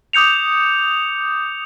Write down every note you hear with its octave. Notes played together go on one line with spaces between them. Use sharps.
D6 D#6 G6 C#7 F7